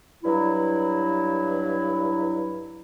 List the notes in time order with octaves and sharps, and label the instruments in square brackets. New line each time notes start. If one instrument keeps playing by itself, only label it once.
[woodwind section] G2 F#3 E4